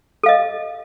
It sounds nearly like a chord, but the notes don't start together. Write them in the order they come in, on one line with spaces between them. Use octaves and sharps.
A4 F5 D#5